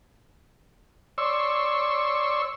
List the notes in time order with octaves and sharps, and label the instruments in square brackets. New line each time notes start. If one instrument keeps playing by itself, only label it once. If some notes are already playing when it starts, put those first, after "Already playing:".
[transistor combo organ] C#5 D5 C6 C#6 E6